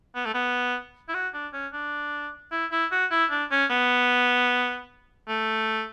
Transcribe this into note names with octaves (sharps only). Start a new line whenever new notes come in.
B3
A3
B3
E4
F#4
D4
C#4
D4
E4
E4
F#4
E4
D4
C#4
B3
A3